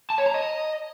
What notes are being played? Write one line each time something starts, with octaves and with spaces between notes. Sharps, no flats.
A5
C#5
A#5
D#5